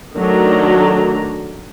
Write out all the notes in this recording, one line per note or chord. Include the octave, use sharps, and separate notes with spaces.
D#3 F#3 A3 D4 A#5